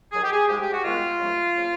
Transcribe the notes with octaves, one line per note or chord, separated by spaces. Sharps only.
D#2 D#3 F#3 G#4
G4
G#4
G#2 F3 G#3 G4
G4
F#4
G#2 D#3 G#3 B3 F4
D#2 C#3 F#3 A3
C#3 F3 A#3